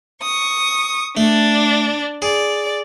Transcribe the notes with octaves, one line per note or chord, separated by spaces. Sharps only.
C#6 D#6
A3 D4 D5
G#4 D5